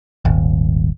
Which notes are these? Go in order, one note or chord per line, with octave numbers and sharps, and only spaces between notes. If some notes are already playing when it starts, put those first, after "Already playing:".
D#1 G#1